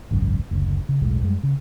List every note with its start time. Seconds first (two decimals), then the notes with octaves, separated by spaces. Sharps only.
0.11 G#1 C#2 F#2
0.51 F#1 D2
0.89 C#3
1.02 E1 B1 A2 G#3
1.23 F#2 G3 G#3
1.43 C#3